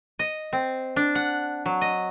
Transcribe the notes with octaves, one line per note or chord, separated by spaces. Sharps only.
D#5
C4
D4
F#5
F#3
D#5